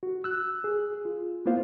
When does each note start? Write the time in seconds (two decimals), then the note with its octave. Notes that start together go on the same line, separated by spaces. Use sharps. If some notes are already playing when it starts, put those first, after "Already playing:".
0.03 F#4
0.24 E6 F#6
0.64 G#4
1.05 F4
1.46 A#3 B3 E4 F4 C5 F5